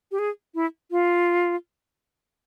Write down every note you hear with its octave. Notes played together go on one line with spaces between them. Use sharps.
G4
G#4
E4
F4